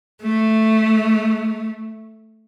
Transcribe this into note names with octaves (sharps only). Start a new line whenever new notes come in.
A3